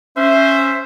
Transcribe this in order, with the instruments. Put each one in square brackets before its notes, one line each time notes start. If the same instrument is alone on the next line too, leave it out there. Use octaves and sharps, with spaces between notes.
[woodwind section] C#4 E5 [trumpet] C5